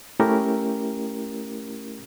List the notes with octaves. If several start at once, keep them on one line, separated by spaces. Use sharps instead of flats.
A3 C#4 E4 G4 A#4